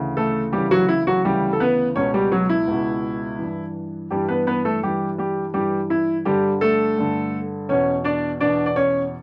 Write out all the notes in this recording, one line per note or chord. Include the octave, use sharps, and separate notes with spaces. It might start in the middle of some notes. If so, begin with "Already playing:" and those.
Already playing: D2 C#3 E3
A3 A4
D2 C#3 E3 G3 G4
F#3 F#4
E4
F#3 F#4
D2 C#3 E3 G3 G4
A4
B3 B4
C#2 B2 C#4 C#5
G3 G4
F#3 F#4
E4
C#2 B2
G2 E3
G2 E3 G3 G4
B3 B4
B3 B4
A3 A4
G2 E3 G3 G4
G3 G4
G2 E3 G3 G4
E4
G2 D3 G3 G4
A3 A4
G2 D3
E2 B2 C#4 C#5
D4 D5
E2 B2 D4 D5
D5
C#4 C#5